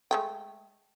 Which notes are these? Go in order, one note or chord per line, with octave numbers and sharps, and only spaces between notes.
G#3 A3 G5